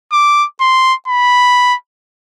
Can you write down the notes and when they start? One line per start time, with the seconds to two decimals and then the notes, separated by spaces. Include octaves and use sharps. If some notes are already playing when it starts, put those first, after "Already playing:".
0.12 D6
0.60 C6
1.08 B5